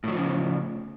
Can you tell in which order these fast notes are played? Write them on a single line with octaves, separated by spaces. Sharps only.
A2 F#3 F3 C#3